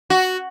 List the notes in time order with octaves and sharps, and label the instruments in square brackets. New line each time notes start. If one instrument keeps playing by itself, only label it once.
[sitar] F#4